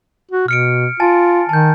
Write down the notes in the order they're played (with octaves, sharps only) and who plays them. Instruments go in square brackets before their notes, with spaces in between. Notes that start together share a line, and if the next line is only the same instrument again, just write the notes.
[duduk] F#4
[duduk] B2 [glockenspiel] F6 C#7 D7
[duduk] F4 [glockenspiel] G#5 A5 A6
[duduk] D#3 [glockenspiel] A5 G6